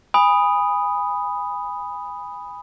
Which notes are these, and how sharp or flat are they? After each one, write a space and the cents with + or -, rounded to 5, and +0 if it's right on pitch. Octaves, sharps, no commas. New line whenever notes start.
G#5 -25 B5 +0 D#6 +0